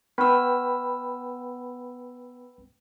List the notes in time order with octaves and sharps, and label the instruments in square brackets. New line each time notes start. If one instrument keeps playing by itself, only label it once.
[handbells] B3 E6 [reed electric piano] B4 G5 B5